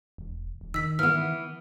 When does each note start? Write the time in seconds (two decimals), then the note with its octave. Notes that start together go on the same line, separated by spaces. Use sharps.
0.18 E1
0.61 E1
0.74 D#3 E6 B6
0.99 E3 B3 F6